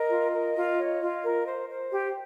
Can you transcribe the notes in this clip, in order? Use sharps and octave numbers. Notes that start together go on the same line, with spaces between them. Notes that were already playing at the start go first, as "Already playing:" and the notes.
Already playing: A#4 D#5
F4
A#4
F4
C#5
F4
A#4
C5
C5
G4